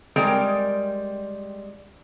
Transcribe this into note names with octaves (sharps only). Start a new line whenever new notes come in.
G3 G#3 C4 A#4 D5 G5